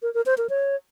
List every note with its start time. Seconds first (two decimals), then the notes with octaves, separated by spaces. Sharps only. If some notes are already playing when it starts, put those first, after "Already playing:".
0.02 A#4
0.14 A#4
0.26 C5
0.38 A#4
0.50 C#5